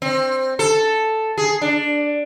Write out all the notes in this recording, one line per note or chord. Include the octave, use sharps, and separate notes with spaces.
C4
A4
G#4
D4